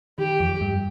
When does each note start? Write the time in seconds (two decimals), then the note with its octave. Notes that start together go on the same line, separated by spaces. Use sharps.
0.18 D#3 G4
0.40 F2 F3
0.61 G2 G3